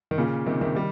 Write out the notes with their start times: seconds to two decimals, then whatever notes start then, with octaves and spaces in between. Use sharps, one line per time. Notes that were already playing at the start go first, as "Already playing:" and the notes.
0.11 D#3
0.18 A#2 C#3
0.46 C3 D#3
0.61 C3 D#3
0.76 D#3 G3